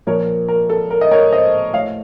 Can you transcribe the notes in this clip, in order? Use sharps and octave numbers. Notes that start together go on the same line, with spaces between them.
A#2 F3 A#3 A#4 C#5
A#4
A4
A#4
D#5
A#4 C#5
C5 D#5
A2 A3 C#5 F5